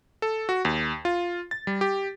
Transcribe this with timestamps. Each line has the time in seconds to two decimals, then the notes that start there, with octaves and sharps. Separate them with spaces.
0.22 A4
0.49 F#4
0.65 D#2
1.05 F4
1.51 A6
1.67 G3
1.81 G4